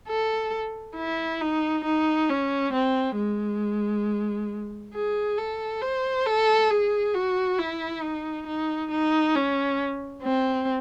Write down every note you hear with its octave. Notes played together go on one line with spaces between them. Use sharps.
A4
E4
D#4
D#4
C#4
C4
G#3
G#4
A4
C5
A4
G#4
F#4
E4
D#4
D#4
D#4
C#4
C4